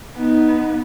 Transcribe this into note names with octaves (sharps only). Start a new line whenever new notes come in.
B3 D#4